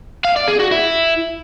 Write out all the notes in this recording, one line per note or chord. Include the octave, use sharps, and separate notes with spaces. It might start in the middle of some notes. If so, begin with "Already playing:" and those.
F5
D5
G#4
F#4
E4